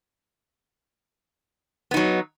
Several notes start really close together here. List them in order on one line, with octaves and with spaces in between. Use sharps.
B3 D#4 F#3